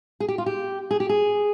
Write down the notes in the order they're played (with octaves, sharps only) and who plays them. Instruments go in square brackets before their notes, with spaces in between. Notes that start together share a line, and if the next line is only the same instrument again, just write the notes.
[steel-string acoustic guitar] G#4
G4
F4
G4
G#4
G4
G#4